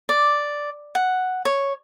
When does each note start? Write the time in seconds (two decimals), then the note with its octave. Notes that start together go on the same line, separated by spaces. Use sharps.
0.09 D5
0.95 F#5
1.45 C#5